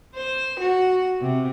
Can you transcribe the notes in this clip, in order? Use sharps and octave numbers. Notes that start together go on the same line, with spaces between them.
C5
F#4
C3